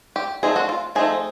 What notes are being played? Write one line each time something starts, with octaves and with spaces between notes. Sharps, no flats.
G4
F3 A3 C4 D#4 G#4
F#4
F4
F3 A3 C4 D#4 G#4